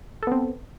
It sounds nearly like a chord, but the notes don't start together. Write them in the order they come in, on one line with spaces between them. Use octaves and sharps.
A4 B3 C4